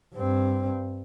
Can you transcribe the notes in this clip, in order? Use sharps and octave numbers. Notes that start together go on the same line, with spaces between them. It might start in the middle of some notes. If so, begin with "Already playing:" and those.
G2 C4